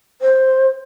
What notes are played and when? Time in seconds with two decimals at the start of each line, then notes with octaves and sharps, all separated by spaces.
0.21 C5